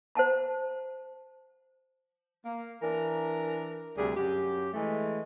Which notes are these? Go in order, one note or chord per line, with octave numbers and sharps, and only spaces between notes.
C5 F#5 A5 A#5
A#3
E3 D4 A#4
D2 C3 G3 G#4
F#2 G4
E3 G#3 A3